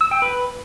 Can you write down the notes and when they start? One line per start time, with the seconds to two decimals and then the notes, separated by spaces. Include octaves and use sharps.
0.01 E6
0.11 G5
0.22 B4